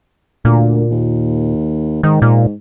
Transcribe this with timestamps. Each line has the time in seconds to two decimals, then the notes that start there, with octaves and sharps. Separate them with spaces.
0.45 D2 A#2
0.91 D#2
2.03 G#2 D#3
2.22 A#2